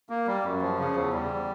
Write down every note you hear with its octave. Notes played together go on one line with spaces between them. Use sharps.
A#3
G3
F#2
F3
C#3
E2
G3